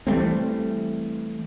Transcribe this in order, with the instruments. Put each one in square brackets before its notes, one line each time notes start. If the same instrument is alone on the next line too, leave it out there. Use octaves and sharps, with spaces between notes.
[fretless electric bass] E3 G3 A3 C4